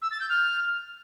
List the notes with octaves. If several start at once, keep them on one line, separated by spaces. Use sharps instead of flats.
E6
A6
G6
F6